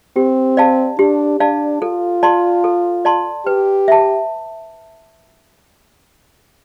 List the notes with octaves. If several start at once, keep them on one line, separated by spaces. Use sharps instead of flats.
C4 G4
D5 F5 A5
D4 G4
D4 D5 F5 A5
F4 A4
D5 A5 C6
A4
D5 A5 C6
G4 B4
E5 A5